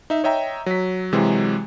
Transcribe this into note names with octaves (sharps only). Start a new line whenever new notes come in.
D#4 E5
C#5 D#5 E5 G5 A#5
F#3 B6
C3 E3 F#3 G#3